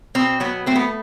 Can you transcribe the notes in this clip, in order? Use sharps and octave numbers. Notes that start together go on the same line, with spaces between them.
B2 C4
F#3 B3
A3 C4
B3